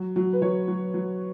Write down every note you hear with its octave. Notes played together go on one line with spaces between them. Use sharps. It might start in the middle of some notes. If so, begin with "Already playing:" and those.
Already playing: F#3
F#3
B4
F#3 C#5
F#3
F#3